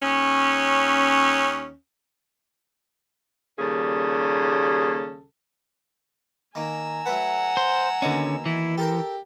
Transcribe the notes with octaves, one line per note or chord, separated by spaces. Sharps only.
D#2 C#4
D#2 A#2 C#3 G3 G#4 A4
D#3 A#3 G#5 A#5 E6
F#3 A3 B4 F#5
C5
D#2 B2 D3 C#4 D#5
E3 E4
G4 A4 A#4 G5